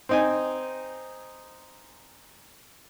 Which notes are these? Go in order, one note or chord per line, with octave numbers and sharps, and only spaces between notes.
C4 D#4 G#5